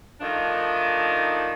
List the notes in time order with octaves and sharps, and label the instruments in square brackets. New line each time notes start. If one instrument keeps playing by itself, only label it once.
[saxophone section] D#3 F3 A3 D4 D#4